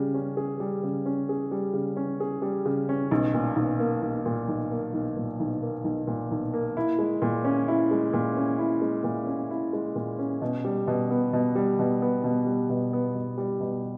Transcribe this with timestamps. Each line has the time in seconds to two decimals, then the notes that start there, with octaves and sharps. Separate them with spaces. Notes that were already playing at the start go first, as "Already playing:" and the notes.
Already playing: C#3 G3
0.14 C#4
0.37 G#4
0.60 G3
0.83 C#3
1.06 C#4
1.29 G#4
1.51 G3
1.74 C#3
1.97 C#4
2.20 G#4
2.42 G3
2.66 C#3
2.89 C#4
3.11 B1
3.34 A#2
3.56 B1
3.80 A#3
4.02 B1
4.26 A#2
4.48 B1
4.71 A#3
4.94 B1
5.16 A#2
5.40 B1
5.62 A#3
5.84 B1
6.07 A#2
6.31 B1
6.54 A#3
6.77 E4
6.99 G#3
7.22 A#2
7.44 C#4
7.68 E4
7.91 G#3
8.13 A#2
8.36 C#4
8.59 E4
8.82 G#3
9.04 A#2
9.27 C#4
9.51 E4
9.73 G#3
9.96 A#2
10.19 C#4
10.42 B2
10.64 G3
10.88 B2
11.10 B3
11.33 B2
11.55 G3
11.79 B2
12.02 B3
12.24 B2
12.46 G3
12.70 B2
12.93 B3
13.15 B2
13.38 G3
13.60 B2